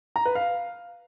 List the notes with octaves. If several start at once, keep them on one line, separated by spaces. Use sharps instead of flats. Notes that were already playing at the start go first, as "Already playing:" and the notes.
A#5
B4
F5